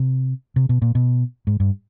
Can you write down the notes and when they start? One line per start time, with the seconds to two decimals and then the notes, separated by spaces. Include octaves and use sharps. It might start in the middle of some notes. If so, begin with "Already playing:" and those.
Already playing: C3
0.56 C3
0.69 B2
0.82 A#2
0.95 B2
1.47 G#2
1.60 G2